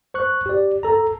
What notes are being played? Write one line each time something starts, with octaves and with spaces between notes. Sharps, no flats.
C5 C#6 F#6
G4 D5
A4 A#5